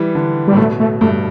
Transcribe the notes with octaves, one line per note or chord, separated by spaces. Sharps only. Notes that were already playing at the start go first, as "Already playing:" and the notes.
Already playing: E3 G3
D3
G3
A2
B2 A3
A3
G2 A3